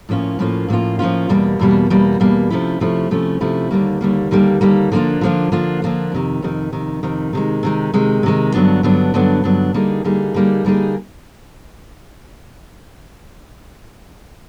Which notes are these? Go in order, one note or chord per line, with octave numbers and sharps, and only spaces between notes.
A2 F3 A#3 C#4 F4
A2 F3 A#3 C#4 F4
A2 F3 A#3 C#4 F4
A2 F3 A#3 C#4 F4
E2 B2 G3 A#3
E2 B2 G3 A#3
E2 B2 G3 A#3
E2 B2 G3 A#3
C3 F3 A3 C#4 E4
C3 F3 A3 C#4 E4
C3 F3 A3 C#4 E4
C3 F3 A3 C#4 E4
D#2 D3 G3 A#3
D#2 D3 G3 A#3
D#2 D3 G3 A#3
D#2 D3 G3 A#3
D3 F3 A#3 D4 F4
D3 F3 A#3 D4 F4
D3 F3 A#3 D4 F4
D3 F3 A#3 D4 F4
F2 C3 D#3
F2 C3 D#3
F2 C3 D#3
F2 C3 D#3
C3 D#3 G#3
C3 D#3 G#3
C3 D#3 G#3
C3 D#3 G#3
G2 D3 F#3 B3 D4
G2 D3 F#3 B3 D4
G2 D3 F#3 B3 D4
G2 D3 F#3 B3 D4
D3 G3 A#3 D#4 G#4
D3 G3 A#3 D#4 G#4
D3 G3 A#3 D#4 G#4
D3 G3 A#3 D#4 G#4